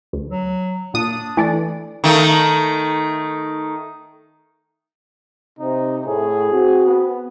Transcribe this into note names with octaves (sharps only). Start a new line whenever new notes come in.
D2
F#3
A#2 D4 D#6
E3 A3 D5
D#3 A3
C3 D#4
A2 G#4
C4 F#4
B3